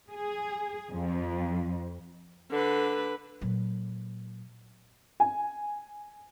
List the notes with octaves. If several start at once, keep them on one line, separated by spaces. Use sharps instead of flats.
G#4
F2
D3 B4
A#2 F#3
G#5